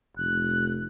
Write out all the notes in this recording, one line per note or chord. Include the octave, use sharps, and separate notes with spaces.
F1 F#6